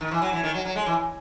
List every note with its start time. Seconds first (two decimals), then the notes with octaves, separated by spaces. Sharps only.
0.01 D#3
0.11 E3
0.22 F#3
0.33 E3
0.43 D#3
0.54 F#3
0.65 F#3
0.76 G#3
0.86 E3